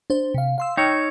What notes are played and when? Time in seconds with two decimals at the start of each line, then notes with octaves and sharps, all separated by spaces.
0.10 D4 C5
0.34 C3 F5
0.58 F5 C6 E6
0.77 D#4 C#5 G5 E6 F6